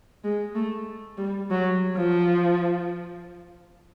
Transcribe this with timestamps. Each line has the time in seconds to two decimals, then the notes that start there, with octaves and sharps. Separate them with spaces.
0.24 G#3
0.55 A3
1.18 G3
1.50 F#3
1.97 F3